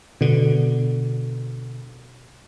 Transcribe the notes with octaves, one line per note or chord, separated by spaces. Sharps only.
B2 D3